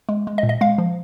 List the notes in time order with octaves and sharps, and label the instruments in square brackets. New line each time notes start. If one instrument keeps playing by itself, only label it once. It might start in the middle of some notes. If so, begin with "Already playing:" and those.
[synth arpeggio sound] G#3
G#3
D#5
A#2
D#5
G#3 F5
F3